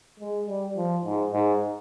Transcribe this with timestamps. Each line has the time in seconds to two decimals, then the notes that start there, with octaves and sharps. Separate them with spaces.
0.20 G#3
0.47 G3
0.76 F3
1.05 G#2
1.33 G#2